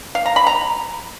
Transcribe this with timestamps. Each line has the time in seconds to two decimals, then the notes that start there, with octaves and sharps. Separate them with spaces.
0.15 F5
0.26 A#5
0.36 B5
0.47 A#5